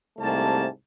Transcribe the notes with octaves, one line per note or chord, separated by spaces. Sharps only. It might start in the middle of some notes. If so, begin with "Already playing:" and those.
C2 G#2 C3 A3 A#3 A5